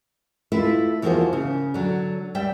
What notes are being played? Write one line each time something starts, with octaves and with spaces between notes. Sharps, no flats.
A3 E4 F4 B4 E5
E2 F3 A#3 F#4 G#4 C5
C#3
D3 F#3
G3 D5 E5 G5